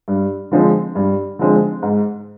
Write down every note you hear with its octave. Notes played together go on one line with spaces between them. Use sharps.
G2
D3 F3 G#3 C4
G2
D3 F3 G#3 C4
G#2